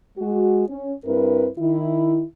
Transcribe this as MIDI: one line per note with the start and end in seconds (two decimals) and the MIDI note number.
0.18 0.67 56
0.18 0.67 66
0.68 0.92 61
1.05 1.47 43
1.05 1.47 60
1.05 1.47 64
1.05 1.47 70
1.05 1.47 71
1.58 2.23 51
1.58 2.23 64